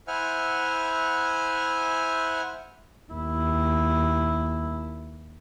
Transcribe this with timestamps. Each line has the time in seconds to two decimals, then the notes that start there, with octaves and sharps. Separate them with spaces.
0.07 E4 C5 E5 F#5 G#5 F6
3.11 D#2 E4